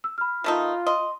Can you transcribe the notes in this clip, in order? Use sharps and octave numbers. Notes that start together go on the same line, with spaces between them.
E6
B5 F6
D#3 A3 D#4 F4
D#5 C6